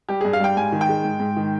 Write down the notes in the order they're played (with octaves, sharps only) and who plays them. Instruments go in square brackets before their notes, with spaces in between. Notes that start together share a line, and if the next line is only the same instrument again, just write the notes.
[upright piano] G3 G4
G2 G#4
F5
G3 G5
G#2 G#5
D#3
G5
G#3
G#2
G#2
D#3